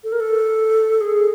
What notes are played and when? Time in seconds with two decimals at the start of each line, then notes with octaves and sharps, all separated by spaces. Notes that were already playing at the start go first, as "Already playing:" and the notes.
0.04 A4
0.12 A#4
0.20 A4
1.01 G#4